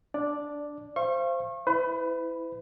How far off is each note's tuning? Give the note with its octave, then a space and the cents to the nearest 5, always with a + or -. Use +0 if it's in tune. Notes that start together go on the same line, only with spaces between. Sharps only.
D4 -5 D5 +0
C5 +0 F5 -35 C#6 -35
E4 +0 B4 +40 B5 +0